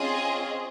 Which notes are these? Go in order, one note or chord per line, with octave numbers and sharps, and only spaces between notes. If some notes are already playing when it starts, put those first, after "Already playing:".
Already playing: C4 C#4 F4 G#4 D#5